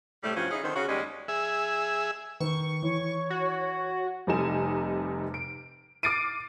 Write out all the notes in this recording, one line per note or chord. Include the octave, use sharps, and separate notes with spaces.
A2 C3 G3 A3
G2 F3 F#3 C#4
C#4 D#4 E4 G#4
D3 D#3 C4
C#3 F#4
D#2 G3 G#3 C#4
G#4 E5
D#3 B4 C#6
E3 C#5
F#4
F1 C3 G3 D#4 G#5 E7
D7
D6 F6 A6 C7 D7 D#7